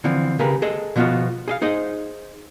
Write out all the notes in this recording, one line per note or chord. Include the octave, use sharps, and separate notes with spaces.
D3 E3 F3 C4
C#3 G4 G#4 A#4 B4
G#4 A4 D#5
B2 F3 B3 D#4 F4 F#4
G#4 D#5 F5
D#4 G#4 C5 D#5